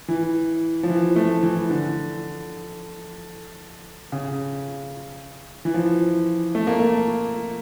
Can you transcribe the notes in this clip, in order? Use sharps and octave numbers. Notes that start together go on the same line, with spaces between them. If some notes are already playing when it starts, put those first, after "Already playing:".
E3
F3
E3
A3
E3
D3
C#3
E3
F3
A3
A#3
A3